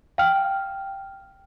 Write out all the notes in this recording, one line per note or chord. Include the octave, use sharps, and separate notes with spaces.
F5 G5 F6